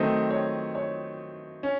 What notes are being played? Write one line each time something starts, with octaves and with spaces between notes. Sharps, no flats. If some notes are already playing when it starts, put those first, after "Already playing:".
Already playing: D#3 F#3 A3 C4 D#5
C#5
C#5
C#4